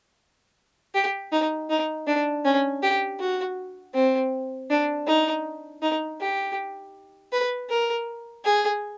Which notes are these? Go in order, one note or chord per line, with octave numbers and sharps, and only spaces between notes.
G4
D#4
D#4
D4
C#4
G4
F#4
C4
D4
D#4
D#4
G4
B4
A#4
G#4